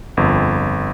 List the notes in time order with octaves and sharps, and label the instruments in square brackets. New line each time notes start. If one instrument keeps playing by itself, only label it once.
[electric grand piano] G1 F2